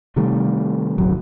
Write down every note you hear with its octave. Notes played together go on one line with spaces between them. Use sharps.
C3 D#3 G3 A3
D1 G1 F#3